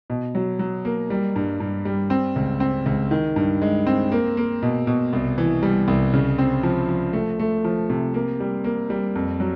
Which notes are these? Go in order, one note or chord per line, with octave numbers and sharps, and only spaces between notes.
B2
F#3
F#3
A#3
G3
G2
G2
G3
C4
C#2
C4
C#2
D#3
G2
G#3
C4
A#3
A#3
B2
B2
C2
E3
G3
C2
C#3
C4
F3
F3
A3
A3
F3
C3
A#3
G3
A#3
G3
F2
F#3